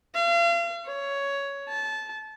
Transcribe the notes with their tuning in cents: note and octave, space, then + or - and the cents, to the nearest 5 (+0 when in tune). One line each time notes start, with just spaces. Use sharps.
F5 -40
C#5 +10
A5 -20